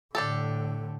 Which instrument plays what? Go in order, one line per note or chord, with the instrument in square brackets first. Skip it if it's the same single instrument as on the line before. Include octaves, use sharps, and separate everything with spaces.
[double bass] A2 D3 [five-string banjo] D4 G4 A4